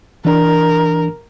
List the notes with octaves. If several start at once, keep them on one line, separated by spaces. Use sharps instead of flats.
E3 D4 A#4